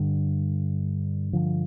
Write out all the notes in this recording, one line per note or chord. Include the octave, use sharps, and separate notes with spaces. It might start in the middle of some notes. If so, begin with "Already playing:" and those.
Already playing: G2 D3
D3 F3